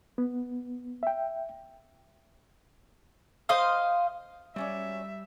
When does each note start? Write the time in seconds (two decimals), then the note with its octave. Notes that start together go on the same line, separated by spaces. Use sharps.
0.18 B3
1.03 E5 G5
3.49 C5 D#5 F5 D#6
4.56 F#3 G3 C#4 D5 E5